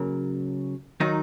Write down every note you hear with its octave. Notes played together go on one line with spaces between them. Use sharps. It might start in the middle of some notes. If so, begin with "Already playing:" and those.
Already playing: C#3 F#3 A#3
D#3 F#3 D#4